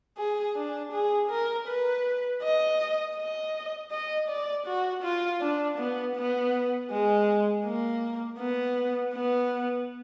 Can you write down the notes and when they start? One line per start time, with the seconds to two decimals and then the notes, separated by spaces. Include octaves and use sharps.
0.18 G#4
0.56 D4
0.92 G#4
1.30 A#4
1.68 B4
2.43 D#5
3.16 D#5
3.92 D#5
4.29 D5
4.67 F#4
5.03 F4
5.41 D4
5.78 B3
6.16 B3
6.90 G#3
7.65 A#3
8.39 B3
9.14 B3